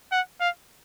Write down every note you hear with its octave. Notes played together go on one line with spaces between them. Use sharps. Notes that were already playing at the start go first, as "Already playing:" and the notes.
F#5
F5